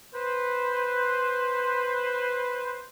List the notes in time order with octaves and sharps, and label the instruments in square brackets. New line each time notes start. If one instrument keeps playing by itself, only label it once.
[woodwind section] B4 C5